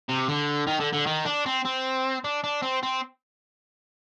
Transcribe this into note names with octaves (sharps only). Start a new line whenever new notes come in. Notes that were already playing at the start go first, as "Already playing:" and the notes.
C3
D3
D#3
D3
D3
D#3
D4
C4
C4
D4
D4
C4
C4